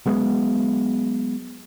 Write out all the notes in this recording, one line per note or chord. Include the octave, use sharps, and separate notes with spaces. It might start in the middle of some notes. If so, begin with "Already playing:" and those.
F#3 G#3 B3